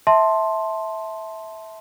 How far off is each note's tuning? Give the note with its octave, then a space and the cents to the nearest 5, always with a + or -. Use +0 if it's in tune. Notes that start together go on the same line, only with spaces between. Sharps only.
E5 -15 A5 +0 C6 +5